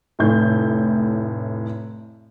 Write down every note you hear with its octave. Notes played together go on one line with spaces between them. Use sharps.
F1 A2 G6